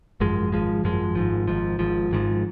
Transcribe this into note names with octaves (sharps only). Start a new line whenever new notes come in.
G#1 F#2 F3 G#3
G#1 F#2 F3 G#3
G#1 F#2 F3 G#3
G#1 G#2 F3
G#1 G#2 F3
G#1 G#2 F3
G#1 G#2 F3